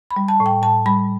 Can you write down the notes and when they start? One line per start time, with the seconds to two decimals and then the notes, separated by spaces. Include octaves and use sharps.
0.11 B5
0.16 G3
0.28 A5
0.40 A2
0.46 G5
0.62 A2 A5
0.86 G3 B5